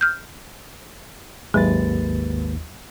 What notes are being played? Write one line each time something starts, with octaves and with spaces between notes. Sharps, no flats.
F6 G6
G#1 D#2 F#3 G#3 B4 A6